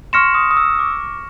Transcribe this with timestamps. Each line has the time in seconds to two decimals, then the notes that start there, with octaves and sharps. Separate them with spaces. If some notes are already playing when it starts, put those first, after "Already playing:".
0.13 C6 C#6 F6 A#6 C#7 E7
0.34 D#6
0.51 D#6
0.57 E6
0.79 D6